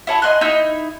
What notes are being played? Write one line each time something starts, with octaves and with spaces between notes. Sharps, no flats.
E4 C#5 A5
D#5 G#5 C6 F#6
D#4 E4 E6 G6